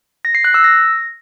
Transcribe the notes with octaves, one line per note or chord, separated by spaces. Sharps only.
A#6
C7
F#6
E6
A#6